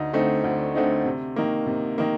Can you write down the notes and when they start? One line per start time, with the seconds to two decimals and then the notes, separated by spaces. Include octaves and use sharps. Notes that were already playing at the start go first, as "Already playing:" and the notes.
Already playing: D2 D#4
0.13 D3 A3 C4 D#4
0.44 D2
0.75 D3 A3 C4 D#4
1.05 C3
1.36 D#3 A#3
1.67 C3
1.98 D#3 A#3